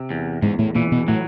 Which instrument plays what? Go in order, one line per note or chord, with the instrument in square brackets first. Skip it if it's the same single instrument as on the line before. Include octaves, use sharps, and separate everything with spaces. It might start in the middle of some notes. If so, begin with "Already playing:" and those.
Already playing: [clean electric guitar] C3
E2
[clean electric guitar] E2 [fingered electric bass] G#2 G#3
[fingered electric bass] A2 A3
[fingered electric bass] A#2 A#3 [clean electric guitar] E3
[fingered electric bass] B2 B3
[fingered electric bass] A2 A3 [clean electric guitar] F#3